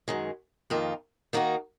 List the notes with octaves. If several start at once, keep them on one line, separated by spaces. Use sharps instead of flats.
F#2 D#3 G#3
F2 D#3 A#3 F4
D#3 A#3 D#4 F#4 A#4